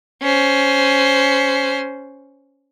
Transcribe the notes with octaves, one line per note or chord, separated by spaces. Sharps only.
C#4 C5